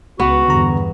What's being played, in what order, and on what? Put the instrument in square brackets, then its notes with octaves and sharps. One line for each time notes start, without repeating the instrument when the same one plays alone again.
[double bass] C#2 [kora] B3 [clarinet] F#4
[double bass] E2 G2 [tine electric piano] D3 A#5